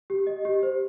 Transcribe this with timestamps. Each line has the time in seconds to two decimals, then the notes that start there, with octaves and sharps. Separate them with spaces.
0.10 G4
0.27 D#5
0.45 G4
0.63 C5